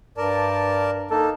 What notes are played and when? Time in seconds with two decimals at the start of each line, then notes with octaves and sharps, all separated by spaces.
0.17 G2 A#4 D5 A5
1.11 A#3 D#4 A4 A5